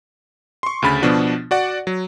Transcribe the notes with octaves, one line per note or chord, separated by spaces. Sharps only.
C6 C#6
D2 C#3 B5 A6
B2 F3 B3 D4 F#4
F#4 D5 F#5
F#3